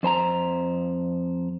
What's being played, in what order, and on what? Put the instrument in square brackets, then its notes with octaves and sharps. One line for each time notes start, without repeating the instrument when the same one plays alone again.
[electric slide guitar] F2 C5 A5 A#5